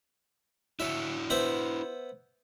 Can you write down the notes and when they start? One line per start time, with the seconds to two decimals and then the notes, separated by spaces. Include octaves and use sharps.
0.80 E4 F#4 C#5 E5
1.30 B3 C5 E5